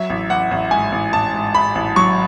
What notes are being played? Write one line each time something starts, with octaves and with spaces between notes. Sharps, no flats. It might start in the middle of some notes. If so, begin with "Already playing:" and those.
Already playing: F#3 E5
A1
A1 F#5
A1
G#2 G#5
A1
A1 A5
G#2
G#2 B5
A1
F#3 C#6